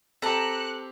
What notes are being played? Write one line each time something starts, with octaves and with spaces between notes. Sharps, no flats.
C4 G4 A4 A5 A#5 F#6 C#7